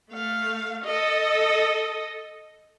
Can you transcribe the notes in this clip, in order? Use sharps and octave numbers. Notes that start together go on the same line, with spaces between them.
A3 F5
A4 D#5